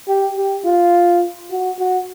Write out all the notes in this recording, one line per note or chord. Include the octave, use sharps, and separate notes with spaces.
G4
G4
F4
F#4
F#4